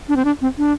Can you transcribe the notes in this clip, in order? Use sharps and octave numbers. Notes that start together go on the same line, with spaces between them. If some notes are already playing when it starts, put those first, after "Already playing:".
D4
C4
D4
C4
D4